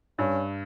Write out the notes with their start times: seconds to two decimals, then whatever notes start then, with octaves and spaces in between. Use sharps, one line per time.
0.19 G2 C#4